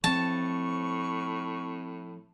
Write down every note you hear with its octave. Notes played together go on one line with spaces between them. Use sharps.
A2 F3 C4 A5 C#6